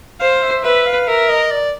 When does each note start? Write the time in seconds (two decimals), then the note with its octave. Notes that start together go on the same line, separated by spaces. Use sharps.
0.20 C5 F5
0.42 E5
0.64 B4 E5
0.86 F5
1.08 A#4 E5
1.29 D#5
1.51 D5